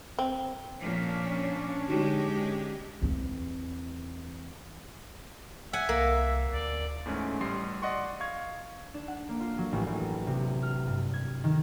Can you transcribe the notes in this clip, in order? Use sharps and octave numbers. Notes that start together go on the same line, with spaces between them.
C4
A#2 F3 C#4 D4 C#5
D3 G#3 D#4 F#4 G4
E2 C4
E5 F#5 G#5
C2 A#3
D2 D5
E2 G#2 A3 C#4
A1 G3 C6 C7
D5 D#5 F#5 C6 C#6
F5 C#6 G#6
D4
F#5
A#3
F4
F#3
A1
A1
C3
F6
G2
G#6
D#3